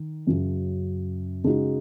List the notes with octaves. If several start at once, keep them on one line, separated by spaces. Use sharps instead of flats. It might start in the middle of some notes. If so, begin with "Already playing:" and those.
Already playing: D#3
F#2 C#3 F#3
C#3 G#3 D#4 F#4